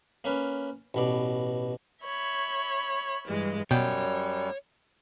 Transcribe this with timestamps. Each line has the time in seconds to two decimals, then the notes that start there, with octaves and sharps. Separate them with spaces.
0.24 A#3 C#4 B4
0.94 A1 B2 D5
2.04 C#5 E5 B5
3.26 G2 E3 G#3
3.71 F#2 B2 G3 C#5 G5